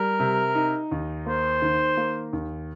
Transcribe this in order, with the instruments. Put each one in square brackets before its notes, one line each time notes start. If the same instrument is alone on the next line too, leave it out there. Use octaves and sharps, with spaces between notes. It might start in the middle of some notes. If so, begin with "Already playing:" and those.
Already playing: [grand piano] G3 [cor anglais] A#4
[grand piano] C3
D#4
D#2
[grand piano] A#3 [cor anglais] C5
[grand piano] D#3
A#3
D#2